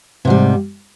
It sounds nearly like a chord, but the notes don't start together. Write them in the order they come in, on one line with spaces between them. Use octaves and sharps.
C3 G#2 G3